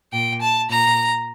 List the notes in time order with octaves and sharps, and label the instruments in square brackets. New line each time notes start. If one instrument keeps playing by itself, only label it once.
[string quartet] A#2 G5
A5
A#2 A#5